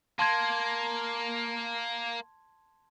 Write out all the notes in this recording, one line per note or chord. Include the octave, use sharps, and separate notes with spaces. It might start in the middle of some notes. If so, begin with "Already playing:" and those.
A#3 A5 C6 G#6